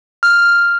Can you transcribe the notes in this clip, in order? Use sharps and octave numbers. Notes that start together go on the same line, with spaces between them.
F6